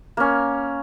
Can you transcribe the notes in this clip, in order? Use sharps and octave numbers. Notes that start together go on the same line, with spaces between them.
A#3 C#4